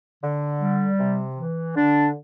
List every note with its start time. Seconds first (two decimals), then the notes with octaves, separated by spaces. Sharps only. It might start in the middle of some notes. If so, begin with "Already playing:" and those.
0.23 D3
0.60 G3
0.99 C3
1.36 E3
1.75 D3 D4